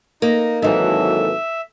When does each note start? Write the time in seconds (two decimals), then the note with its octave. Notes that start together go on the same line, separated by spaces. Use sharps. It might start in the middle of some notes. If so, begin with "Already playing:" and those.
0.22 A#3 D#4
0.62 G#1 E3 F#3 D#4 A4 E5